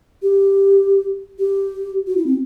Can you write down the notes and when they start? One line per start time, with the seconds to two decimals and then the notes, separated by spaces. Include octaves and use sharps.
0.23 G4
1.39 G4
2.07 F#4
2.17 E4
2.27 C4